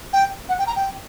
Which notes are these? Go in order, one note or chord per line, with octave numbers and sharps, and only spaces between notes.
G5
F#5
G5
A#5
G5